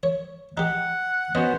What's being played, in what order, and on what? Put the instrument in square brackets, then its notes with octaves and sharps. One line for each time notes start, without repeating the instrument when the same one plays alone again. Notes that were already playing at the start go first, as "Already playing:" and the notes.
[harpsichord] C#5
[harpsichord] D#4 G4 [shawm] F#5
[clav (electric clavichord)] B3 C#4 F#4 [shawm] C5 [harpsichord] D#5